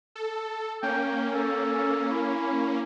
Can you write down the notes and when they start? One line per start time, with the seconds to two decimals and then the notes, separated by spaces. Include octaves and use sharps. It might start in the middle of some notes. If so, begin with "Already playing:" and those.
0.16 A4
0.83 A#3 C#4 G5
1.34 A4
2.10 E4